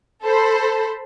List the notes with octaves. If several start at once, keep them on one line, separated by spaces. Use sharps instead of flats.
A4 C5 B5